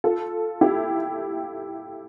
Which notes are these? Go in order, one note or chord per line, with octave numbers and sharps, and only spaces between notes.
F4 A4
E4 G4